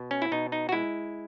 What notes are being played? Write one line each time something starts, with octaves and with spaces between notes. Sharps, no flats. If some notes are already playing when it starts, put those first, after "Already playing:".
Already playing: B2
C#4
E4
B2 D#4
D#4
F#4
G#3 E4